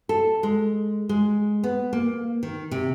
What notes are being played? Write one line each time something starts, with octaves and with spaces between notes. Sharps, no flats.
A4
G#3
G#3
B3
A#3
D#3
C3